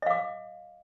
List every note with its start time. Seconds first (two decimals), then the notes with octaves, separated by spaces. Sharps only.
0.02 D#5
0.06 F5
0.10 D6